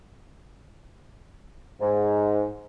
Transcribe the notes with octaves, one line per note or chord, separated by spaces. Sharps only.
G#2